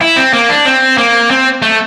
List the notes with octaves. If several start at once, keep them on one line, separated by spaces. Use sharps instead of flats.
E4
C4
A#3
D4
C4
A#3
C4
A3